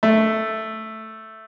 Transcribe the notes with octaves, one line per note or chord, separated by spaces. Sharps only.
A3